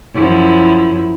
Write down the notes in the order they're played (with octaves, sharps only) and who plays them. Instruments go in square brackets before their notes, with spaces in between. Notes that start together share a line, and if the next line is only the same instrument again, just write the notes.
[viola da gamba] F#2 F3 E4